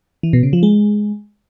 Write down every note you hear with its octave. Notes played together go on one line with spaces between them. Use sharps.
E3
B2
C#3
F3
G#3